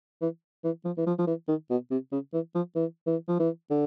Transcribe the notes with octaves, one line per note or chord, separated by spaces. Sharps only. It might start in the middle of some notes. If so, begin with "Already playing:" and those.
E3
E3
F3
E3
F3
F3
E3
D#3
B2
C3
C#3
E3
F3
E3
E3
F3
E3
D3